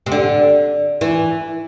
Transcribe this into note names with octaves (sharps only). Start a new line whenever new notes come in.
C3
D3
E3